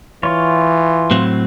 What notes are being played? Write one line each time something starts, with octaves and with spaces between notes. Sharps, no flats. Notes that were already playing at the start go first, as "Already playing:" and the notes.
E3 F4 C#5
A2 F#3 C4